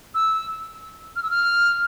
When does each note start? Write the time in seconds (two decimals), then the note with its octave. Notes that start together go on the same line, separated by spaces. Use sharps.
0.15 E6
1.16 F6
1.23 E6
1.31 F6